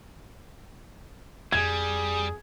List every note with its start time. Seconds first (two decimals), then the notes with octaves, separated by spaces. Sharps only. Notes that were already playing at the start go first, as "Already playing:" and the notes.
1.52 F2 G3 G#4 G#6